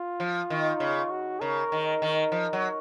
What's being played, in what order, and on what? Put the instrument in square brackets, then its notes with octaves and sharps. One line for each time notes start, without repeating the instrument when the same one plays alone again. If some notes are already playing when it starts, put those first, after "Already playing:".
Already playing: [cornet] F4
[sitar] F3
D#3
C#3
[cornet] F#4
[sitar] C#3 [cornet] A#4
[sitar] D#3
D#3
F3
F#3